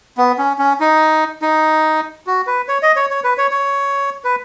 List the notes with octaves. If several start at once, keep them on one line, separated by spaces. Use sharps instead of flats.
B3
C#4
C#4
D#4
D#4
F#4
B4
C#5
D#5
C#5
C#5
B4
C#5
C#5
B4